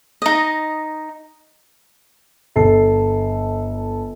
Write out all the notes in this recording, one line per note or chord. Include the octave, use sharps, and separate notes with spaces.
D#4 D#5
G1 A4 A5 C7